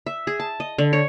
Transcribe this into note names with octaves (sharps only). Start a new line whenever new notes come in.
E5
G#4
A5
D#5
D3
C#5